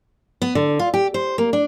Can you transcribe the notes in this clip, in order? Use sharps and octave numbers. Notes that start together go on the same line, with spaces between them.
B3
D3
F4
G4
C5
A#3
D4